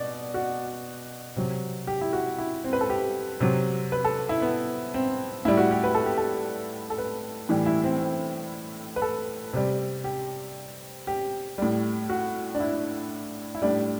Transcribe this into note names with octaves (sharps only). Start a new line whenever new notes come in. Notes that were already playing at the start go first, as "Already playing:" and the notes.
Already playing: B2 D5
F#4
C3 F#3
G4
E4
F#4
E4
C4
B4
A4
G4
C3 F#3
B4
A4
E4
B3
C4
A2 G3 E4
F#4
G4
B4
A4
G4
A4
A4
B4
A2 E3 G3 G4
E4
C4
C4
B4
A4
C3 G3
G4
G4
A2 G3
F#4
D4
E4
E4
A2 G3 D4